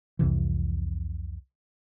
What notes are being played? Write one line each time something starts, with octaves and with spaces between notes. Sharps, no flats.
C2 F2 C3 E3